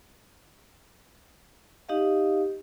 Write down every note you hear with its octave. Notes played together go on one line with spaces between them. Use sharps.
D#4 G4 D#5 F5